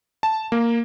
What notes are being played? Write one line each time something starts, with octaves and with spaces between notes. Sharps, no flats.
A5
A#3